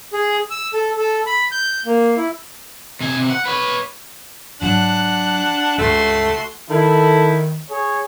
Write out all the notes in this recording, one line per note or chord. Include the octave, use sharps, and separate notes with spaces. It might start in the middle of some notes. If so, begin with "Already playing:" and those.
G#4
E6
A4
A4
B5
G6
A#3
E4
C3 G#5
C3
F#5
B4 C#5
G#2 F#3 D4 F#5
C#2 G2 A3 F#4 C6
D#3 E4 A4
G#4 C#5